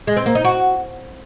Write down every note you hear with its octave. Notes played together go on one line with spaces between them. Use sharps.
G#3
C4
A#3
D#4
F#4